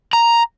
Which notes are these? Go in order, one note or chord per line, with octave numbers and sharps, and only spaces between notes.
A#5